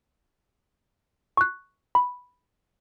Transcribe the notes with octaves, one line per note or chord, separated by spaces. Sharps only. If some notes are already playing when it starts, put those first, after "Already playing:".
C#6 F#6
B5